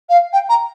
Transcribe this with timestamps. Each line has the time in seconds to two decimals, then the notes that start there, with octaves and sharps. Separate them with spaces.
0.09 F5
0.33 G5
0.49 A#5